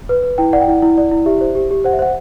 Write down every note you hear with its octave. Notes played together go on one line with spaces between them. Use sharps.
B4
B4
E4 G5
D5 F#5
G5
E4 F#5
E4
D5
E4
G4 E5
C5
G4
G4
C5 F#5
E5
C5 F#5